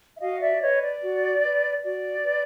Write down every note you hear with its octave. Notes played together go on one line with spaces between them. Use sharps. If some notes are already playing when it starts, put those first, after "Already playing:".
E5
F#4 D#5 F5
D5 E5
B4 C#5 D#5
D5
F#4
B4
F#4 D5
B4